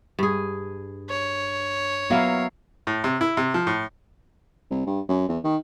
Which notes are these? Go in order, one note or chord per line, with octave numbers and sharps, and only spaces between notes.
G2 G#4
C#5
F#3 A#3 B3 E4 F5
A2
C3
E4
C3
F3
A2
C2
G2
F#2
E2
D#3